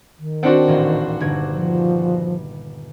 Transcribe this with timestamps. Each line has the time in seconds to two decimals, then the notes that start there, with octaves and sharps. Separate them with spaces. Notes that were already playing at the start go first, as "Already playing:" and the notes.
0.19 D#3
0.43 C4 D4 F#4 F#5 G5 A5
0.68 D#1 A1 C6
1.20 G1 G#6
1.52 F3